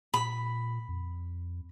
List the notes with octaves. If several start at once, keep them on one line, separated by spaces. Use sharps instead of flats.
A#2 B5
F2